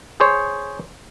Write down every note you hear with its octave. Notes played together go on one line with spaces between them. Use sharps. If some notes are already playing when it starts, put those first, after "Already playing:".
G#4 C5 C#5